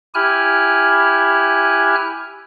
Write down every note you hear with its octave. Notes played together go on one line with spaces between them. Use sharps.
E4 G4 G#5 F6 F#6